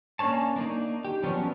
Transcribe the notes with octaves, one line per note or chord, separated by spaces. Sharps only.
A#3 C#4 D4 C#5 A5
A#3 D4 D#4
G4
F3 F#3 B3 C#4 D4